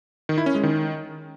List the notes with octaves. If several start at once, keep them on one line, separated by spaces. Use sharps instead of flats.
D#3
E4
C#4
G#3
D#3